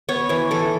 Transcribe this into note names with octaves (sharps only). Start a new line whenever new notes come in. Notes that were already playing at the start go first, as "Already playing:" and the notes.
B3 C#5
E3 C#5
E3 A4